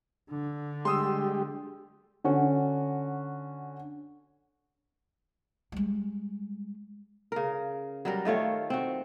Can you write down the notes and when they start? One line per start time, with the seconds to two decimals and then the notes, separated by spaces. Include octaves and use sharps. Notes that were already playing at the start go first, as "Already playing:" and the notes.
0.30 D3
0.85 G3 G#3 G4 C6 D#6 E6
2.24 D3 C#4 F#4
5.72 G3 G#3
7.32 C#3 A#4
8.05 F#3 G3 A#4
8.25 D#3 A3 F4 C#5
8.70 C4 F#4